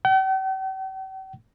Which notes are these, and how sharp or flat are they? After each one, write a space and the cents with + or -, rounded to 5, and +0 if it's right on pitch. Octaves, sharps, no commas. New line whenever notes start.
G5 -45